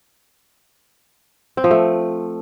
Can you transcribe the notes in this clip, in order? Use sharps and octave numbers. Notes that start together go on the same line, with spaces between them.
C4
F3
A3